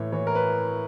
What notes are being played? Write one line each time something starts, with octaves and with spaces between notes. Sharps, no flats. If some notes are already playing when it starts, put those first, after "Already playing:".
Already playing: A2 E3 C#5
E3 C#5
A#4
B4